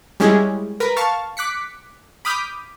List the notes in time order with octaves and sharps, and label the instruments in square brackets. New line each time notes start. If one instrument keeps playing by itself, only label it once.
[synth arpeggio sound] G3 G#3 C#4 E4 G#4
A#4 B4 B5
F5 A5 C#6 F6
D6 F#6 B6 C#7
B5 D6 D#6 F6 G6 B6